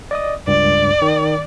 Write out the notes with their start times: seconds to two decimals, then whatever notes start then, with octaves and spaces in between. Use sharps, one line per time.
0.11 D5 D#5 D#6
0.47 C#2 G2 D5
1.02 D#3